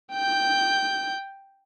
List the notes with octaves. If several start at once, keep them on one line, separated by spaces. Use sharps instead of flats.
G5 G6